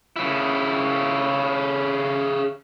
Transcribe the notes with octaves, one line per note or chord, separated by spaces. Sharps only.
C#3 E4